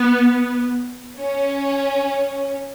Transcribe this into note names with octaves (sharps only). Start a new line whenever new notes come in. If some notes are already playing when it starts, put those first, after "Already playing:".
Already playing: B3
C#4